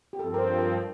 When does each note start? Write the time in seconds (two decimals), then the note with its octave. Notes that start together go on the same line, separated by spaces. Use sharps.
0.13 G4
0.19 G2 F3 C4 A4
0.34 A#4
0.39 C5
0.58 A#4